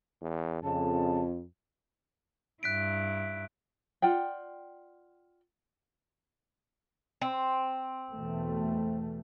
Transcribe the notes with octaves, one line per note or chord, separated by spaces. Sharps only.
E2
F2 C#3 A5
G2 E4 F#6 B6 D7
F4 D5 F#5 G5
C4
E2 B2 A3